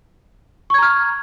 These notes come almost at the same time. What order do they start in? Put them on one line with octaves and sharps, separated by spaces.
C#6 G#6 A#5 F6